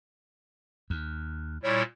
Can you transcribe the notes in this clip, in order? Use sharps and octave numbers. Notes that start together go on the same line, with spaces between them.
D#2
A#2 G3 E4 C#5